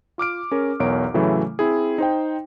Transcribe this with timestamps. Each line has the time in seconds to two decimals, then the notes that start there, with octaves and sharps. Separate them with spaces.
0.18 F4 D6 F6 D7
0.51 C#4 G#4 A#4
0.80 B1 E2 A#4 C#5 D7
1.14 A2 C#3 E3 F#3 A3 E4
1.59 C4 E4 G#4
1.98 D#4 C5 G5